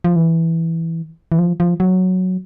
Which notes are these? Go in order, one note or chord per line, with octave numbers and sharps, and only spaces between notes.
F3
E3
E3
F3
F3
F#3